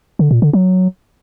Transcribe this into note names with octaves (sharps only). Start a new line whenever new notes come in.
D3
A#2
D3
F#3